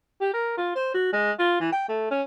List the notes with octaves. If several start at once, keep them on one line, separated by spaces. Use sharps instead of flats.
G4
A#4
F4
C5
F#4
G#3
F4
E3
G5
A3
C#4